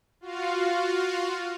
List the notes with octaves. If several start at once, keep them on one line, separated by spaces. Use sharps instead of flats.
F4 F#4 F5